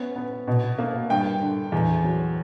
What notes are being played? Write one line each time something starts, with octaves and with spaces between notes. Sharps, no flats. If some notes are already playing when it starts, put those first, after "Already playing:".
Already playing: B3 C#4
B3
B2
A#3
G2 G5
D3
E2
F#3